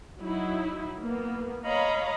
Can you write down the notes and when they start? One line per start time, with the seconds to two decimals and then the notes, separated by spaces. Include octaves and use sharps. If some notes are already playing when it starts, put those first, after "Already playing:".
0.21 F#3 D#4 E4
1.00 A#3 B3
1.65 C#5 D#5 F5 A#5 B5